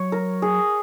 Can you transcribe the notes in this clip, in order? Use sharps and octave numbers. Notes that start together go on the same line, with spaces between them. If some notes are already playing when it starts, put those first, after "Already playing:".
Already playing: F#3 C#5
A#4
G#4